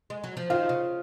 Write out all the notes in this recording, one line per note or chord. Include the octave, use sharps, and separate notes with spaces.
G#3
F#3
F3
D#3 F4
C#3